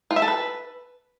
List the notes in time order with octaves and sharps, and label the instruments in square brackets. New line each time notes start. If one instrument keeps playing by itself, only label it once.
[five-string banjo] F4
E5
A4
B4